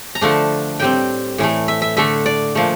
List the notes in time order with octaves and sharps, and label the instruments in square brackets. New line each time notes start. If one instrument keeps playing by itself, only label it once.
[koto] A#5
D3 F3 A3 D4 A5
A2 G3 C4 G5
A2 E3 A3
E5
E5
D3 A3 D4 E5
D5
A#2 F3 A3